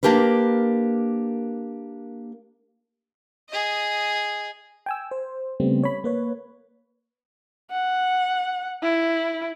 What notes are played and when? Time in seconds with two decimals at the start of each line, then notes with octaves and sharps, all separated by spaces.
0.03 A#3 D4 G4 A#4 B4
3.49 G#4 D#5
4.86 G5 G#5 E6
5.11 C5
5.60 C#3 G3 A3 B3 C4
5.83 C#5 B5
6.04 A#3 B4 C#5
7.71 F#5
8.83 E4